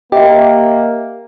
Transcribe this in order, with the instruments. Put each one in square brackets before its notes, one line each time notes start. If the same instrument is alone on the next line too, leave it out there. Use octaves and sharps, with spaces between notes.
[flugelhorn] A#3 [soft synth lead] G4 [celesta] D#5 E5